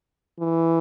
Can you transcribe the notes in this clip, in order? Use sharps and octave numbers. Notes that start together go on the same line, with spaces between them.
E3